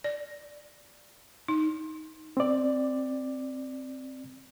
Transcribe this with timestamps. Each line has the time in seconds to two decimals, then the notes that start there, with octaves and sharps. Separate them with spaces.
0.04 D5
1.48 D#4
2.37 C4 D5